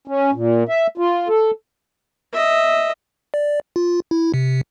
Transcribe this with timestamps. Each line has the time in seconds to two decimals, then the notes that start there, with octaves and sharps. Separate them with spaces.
0.08 C#4
0.33 A#2
0.69 E5
0.98 F4
1.28 A4
2.33 D#5 E5
3.34 D5
3.76 F4
4.11 E4
4.34 C3